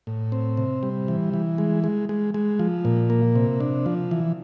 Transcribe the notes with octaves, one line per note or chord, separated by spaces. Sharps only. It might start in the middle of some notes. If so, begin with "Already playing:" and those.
A2
C4
C3
G3
E3
E3
G#3
G#3
G#3
G#3
F3
A#2
A#3
C3
D4
F3
E3